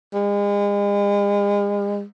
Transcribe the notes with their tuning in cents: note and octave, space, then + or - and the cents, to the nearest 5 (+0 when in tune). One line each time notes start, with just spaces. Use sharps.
G#3 -40